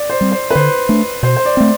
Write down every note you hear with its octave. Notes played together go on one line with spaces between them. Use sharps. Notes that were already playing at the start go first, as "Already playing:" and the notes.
Already playing: D5
C5
G3 C4
C5
B4
D3 C5
A3 D4
B2 C5
C5
D5
A3 C4